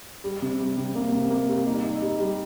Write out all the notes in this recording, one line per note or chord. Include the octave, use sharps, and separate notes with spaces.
G3
C3
G3
C3
A#3
C3
A#3
G3
D#4
D#4
G3
G3